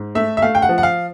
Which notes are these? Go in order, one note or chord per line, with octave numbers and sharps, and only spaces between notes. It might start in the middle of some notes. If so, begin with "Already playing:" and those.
Already playing: G#2
A3 E5
E5
A3 F5
G5
F#5
F3
F#5
F5